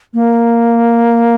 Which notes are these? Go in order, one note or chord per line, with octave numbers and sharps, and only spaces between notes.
A#3